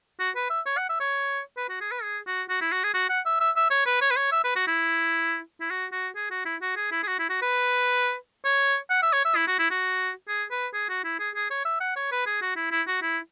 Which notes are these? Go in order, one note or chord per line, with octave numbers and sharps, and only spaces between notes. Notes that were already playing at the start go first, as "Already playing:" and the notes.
F#4
B4
E5
C#5
F#5
E5
C#5
B4
F#4
G#4
B4
G#4
F#4
F#4
E4
F#4
G#4
F#4
F#5
E5
E5
E5
C#5
B4
C#5
B4
C#5
E5
B4
F#4
E4
E4
F#4
F#4
G#4
F#4
E4
F#4
G#4
E4
G#4
F#4
E4
F#4
B4
C#5
F#5
E5
C#5
E5
E4
F#4
E4
F#4
G#4
B4
G#4
F#4
E4
G#4
G#4
C#5
E5
F#5
C#5
B4
G#4
F#4
E4
E4
F#4
E4